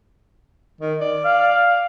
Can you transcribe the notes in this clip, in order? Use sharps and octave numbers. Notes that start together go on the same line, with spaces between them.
D#3
D5
F5